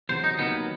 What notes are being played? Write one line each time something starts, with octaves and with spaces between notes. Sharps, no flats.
E2 C3 F#3 C5
D#4
D#2 D#3 F#3 B3